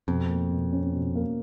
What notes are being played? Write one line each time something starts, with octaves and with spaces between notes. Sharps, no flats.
F2 B2
A#3
B2
C#4
B2
A#3